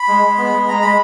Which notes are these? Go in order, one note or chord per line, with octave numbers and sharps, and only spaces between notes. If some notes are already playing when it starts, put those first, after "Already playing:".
Already playing: B5
G#3
G#3
B3
G#3
G#3 A#5
G#3 B5